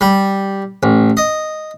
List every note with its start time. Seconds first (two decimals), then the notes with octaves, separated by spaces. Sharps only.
0.01 G3
0.83 A1
1.17 D#5